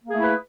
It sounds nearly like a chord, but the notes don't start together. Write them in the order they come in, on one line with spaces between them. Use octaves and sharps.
A#3 G#4 A3 E4 B4